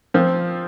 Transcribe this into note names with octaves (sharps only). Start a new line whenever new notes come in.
F3 C4 F4